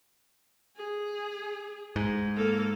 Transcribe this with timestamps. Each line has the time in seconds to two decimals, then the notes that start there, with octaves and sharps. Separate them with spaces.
0.77 G#4
1.96 G#2
2.36 A#3 A4